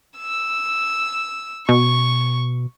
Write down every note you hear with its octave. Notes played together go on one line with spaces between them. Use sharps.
E6
B2 C#6